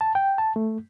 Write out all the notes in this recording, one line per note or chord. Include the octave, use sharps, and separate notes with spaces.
A5
G5
A5
A3